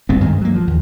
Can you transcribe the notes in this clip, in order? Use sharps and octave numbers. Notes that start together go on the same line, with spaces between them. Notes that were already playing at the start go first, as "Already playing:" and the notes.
C#2 G2 B3 C4
G2 D#3 G#3
F#3 A#3
F3
D#2